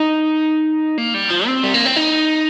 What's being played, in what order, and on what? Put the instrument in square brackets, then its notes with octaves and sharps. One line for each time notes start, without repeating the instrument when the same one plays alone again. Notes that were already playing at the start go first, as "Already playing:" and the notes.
Already playing: [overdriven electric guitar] D#4
A#3
G3
F3
C4
G3
A#3
C4
D#4